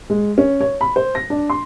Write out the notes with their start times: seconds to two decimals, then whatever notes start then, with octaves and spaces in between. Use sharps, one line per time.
0.10 G#3
0.38 C#4
0.61 C#5
0.81 B5
0.96 C5
1.15 A#6
1.30 D4
1.50 C6